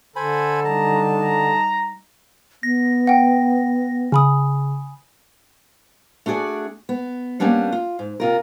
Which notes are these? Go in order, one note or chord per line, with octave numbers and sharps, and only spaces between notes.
D3 A4 C5 G#5 B5
G3 D#4 A5 A#5
A#5
B3 A#6
F#5 G5
C#3 G#5 B5 D#6
A3 D4 F#4 G#4 D5
B3
G3 A#3 B3 C#4 D4
F4
G#2
C3 F4 A#4